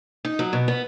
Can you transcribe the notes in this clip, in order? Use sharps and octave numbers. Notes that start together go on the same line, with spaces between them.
D#4
F#3
B2
B3